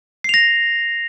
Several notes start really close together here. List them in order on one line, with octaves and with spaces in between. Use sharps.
C7 F7 A#6